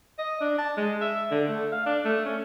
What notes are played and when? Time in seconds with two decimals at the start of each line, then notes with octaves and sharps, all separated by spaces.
0.18 D#5
0.41 D4
0.58 A5
0.77 G#3
1.01 E5
1.31 D3
1.48 A3
1.72 F5
1.86 D4
2.05 A3
2.26 C#4